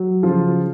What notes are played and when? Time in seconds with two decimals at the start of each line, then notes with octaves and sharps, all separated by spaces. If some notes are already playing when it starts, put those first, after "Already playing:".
Already playing: F#3
0.23 C#3 F3 F4